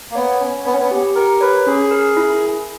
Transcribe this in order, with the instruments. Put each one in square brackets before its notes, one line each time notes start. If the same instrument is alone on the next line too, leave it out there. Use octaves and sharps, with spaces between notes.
[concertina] A#3
[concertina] B3 [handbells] C#5
[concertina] C#4 [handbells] C#5
[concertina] B3 [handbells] C#5
[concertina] C#4
B3
[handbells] G4
[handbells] G4 [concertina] A#4
[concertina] B4 [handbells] C#5
[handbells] C#4 [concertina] G#4
[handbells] A#4
E4